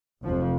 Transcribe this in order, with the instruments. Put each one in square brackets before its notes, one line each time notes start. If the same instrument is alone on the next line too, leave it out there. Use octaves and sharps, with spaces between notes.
[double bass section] F1 F2 F3